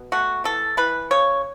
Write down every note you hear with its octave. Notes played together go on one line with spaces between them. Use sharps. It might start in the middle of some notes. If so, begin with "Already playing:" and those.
Already playing: B2
A3 F#4
E3 A4
E3 B4
C#3 C#5